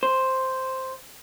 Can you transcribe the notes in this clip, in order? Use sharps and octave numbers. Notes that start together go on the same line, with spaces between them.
C5